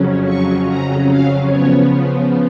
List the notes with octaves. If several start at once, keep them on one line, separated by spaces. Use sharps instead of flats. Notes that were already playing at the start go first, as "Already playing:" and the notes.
Already playing: F2 C#3 F#3 C#4
C#6
A#5
F5
C#3 F3 B3 C#5